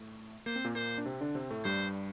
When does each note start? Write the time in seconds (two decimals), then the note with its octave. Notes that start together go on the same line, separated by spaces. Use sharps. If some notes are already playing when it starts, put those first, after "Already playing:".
Already playing: A2 A3
0.46 A#3 C5
0.56 C4
0.64 A#2 A#3
0.75 A#2 A#3 C5
0.98 D4
1.06 C3 C4
1.21 D3 D4
1.35 C3 C4
1.50 A2 A3
1.65 G2 G3 C5